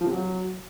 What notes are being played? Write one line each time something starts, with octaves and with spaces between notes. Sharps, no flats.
F3
C3
F#3